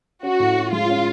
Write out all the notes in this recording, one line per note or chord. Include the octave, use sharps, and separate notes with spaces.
C#4 F#4
A2
C#4
G#3 F4
C#4